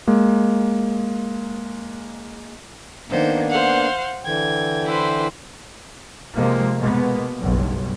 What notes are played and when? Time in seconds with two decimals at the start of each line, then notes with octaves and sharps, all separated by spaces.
0.07 G#3 A#3
3.10 D#3 A#3 B3 D4 C5
3.50 C5 F5 F#5
4.24 D3 E3 G5 G#6
4.84 E4 B4 C5
6.36 C3 F3 G#3 A#3
6.79 B2 G#3 A#3 B3
7.41 F#1 B1 G2